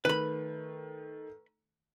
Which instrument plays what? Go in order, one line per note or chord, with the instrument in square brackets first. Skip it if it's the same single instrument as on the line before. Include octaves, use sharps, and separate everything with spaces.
[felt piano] D#3 A3 [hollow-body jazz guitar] B4 B5